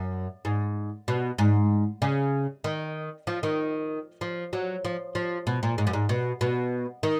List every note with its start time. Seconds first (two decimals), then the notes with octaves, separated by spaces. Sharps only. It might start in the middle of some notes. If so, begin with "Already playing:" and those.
Already playing: F#2
0.45 G#2
1.08 B2
1.38 G#2
2.02 C#3
2.64 D#3
3.27 F3
3.43 D#3
4.21 F3
4.53 F#3
4.85 F3
5.15 F3
5.47 B2
5.63 A#2
5.78 G#2
5.87 F#2
5.93 G#2
6.09 B2
6.41 B2
7.03 D#3